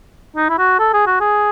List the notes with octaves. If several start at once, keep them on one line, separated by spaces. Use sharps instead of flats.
D#4
E4
F#4
A4
G#4
F#4
G#4